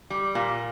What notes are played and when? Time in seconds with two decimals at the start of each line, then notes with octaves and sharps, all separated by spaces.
0.10 G3
0.35 A#2